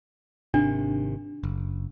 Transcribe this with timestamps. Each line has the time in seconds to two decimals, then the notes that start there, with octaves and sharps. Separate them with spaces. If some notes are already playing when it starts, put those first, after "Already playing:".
0.54 G#1 C3 D#3 D4
1.44 F#1